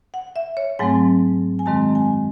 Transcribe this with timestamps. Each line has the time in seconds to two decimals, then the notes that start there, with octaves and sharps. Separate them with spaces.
0.14 F#5
0.36 E5
0.57 C#5
0.79 G#2 F#3 A3 C4 G#5
1.59 G#5
1.66 F#2 D#3 G#3 C4 A5
1.95 G#5